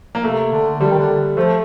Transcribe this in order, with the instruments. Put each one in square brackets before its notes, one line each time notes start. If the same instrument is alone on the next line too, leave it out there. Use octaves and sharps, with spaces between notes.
[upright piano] A#3
[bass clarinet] C3 [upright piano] A3
[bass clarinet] D3
[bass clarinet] D3 [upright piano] G3
[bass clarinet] D#3
D3
[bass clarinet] F3 [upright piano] A3